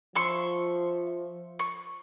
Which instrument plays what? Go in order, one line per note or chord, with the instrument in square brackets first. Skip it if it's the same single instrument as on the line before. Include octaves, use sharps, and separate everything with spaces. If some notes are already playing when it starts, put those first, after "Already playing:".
[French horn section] F3 [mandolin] E5 C6 C#6
[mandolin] C#6